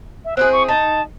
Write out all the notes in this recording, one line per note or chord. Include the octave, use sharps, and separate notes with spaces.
E5
C4 E4 G#4 F#6
C#6
D#4 A5